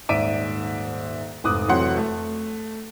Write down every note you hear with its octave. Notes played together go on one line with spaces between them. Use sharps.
D#1 G#2 D5 E5 D7 D#7
F1 G#2 D6 D#6 F#6
F1 F2 E3 F#3 F#5 C6
A3